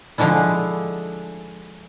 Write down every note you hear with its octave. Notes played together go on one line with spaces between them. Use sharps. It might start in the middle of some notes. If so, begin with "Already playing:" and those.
D3 F3 G#3 D4 E4